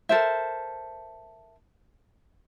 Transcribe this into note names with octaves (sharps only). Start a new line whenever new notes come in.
A4 A#4 C5 E5